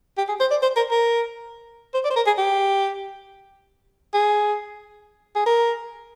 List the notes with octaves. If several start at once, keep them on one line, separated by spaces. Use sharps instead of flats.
G4
G#4
C5
D5
C5
A#4
A#4
C5
D5
C5
A#4
G#4
G4
G#4
G#4
A#4